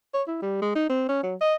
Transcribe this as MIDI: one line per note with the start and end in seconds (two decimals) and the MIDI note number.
0.14 0.23 73
0.28 0.41 64
0.42 0.61 55
0.62 0.71 56
0.75 0.89 63
0.89 1.08 60
1.08 1.23 61
1.23 1.35 54
1.41 1.55 75